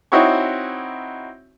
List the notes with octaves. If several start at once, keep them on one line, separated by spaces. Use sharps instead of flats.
C4 D#4 E4 F#4 C#5 C#6